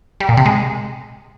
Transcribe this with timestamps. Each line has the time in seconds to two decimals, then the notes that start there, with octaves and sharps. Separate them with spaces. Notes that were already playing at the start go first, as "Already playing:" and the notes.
0.20 G3
0.29 A#2
0.37 C3
0.46 G#3